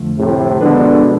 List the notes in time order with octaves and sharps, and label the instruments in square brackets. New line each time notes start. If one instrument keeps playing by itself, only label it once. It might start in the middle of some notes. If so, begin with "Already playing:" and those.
Already playing: [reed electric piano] F2 D3 F3 A3
[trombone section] A2 C3
[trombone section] B2 D3 [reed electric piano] F3 G#3 D4 G#4 B4